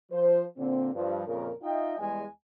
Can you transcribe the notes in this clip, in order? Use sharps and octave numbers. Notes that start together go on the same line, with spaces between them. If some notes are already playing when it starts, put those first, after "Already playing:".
F3 C5
A#2 D3 A#3 C4
G2 F3
F2 A#2 C#3 A#4
D#4 F4 D#5 E5 G5
E2 G3 G#3 G#5